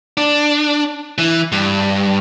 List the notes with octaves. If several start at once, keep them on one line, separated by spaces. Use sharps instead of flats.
D4
E3
G2